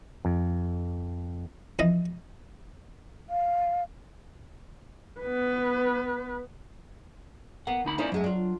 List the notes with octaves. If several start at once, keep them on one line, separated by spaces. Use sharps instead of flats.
F2
F2 E3 D#5
F5
B3 B4
A#3 B3 F#5
D2 D#4 B5
A#3 C#4 D#4 E4 C5 D5
F#2 F#3 G#3 A3
D4 F4